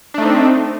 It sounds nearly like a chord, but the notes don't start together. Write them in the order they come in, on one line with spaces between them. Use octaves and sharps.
D4 A3 D#4 C4